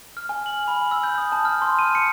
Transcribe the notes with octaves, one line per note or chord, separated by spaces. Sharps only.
F6
G#5
F#7
B5
E6
G6
D#6
A5
F6
C6
D#7
C#7